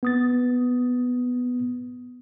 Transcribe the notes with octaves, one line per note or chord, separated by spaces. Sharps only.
B3 D#6 A6